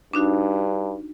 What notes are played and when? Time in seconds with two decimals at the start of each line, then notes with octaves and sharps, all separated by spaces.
0.14 G2 D4 D#4 F#4